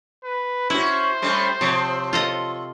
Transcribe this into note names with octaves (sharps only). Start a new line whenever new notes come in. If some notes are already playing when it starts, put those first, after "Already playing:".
B4
C#4 E4 F#4 C5
G3 A3 C#4
C3 F3 C4 C#5
F4 A4 D#5